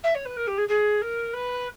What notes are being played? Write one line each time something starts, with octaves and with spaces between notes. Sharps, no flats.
E5
C#5
B4
A#4
G4
G#4
G#4
A#4
B4